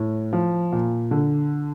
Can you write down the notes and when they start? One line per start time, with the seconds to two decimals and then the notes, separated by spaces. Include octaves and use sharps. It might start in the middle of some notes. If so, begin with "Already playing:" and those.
Already playing: A2
0.33 F3
0.72 A#2
1.11 D3